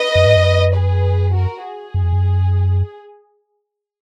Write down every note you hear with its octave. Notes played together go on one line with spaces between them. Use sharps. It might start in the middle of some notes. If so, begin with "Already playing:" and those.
Already playing: B4 D#5
F#2
G#2
F#2
G#4 B4
F#4 A#4
G#4
F#2
F2
F#2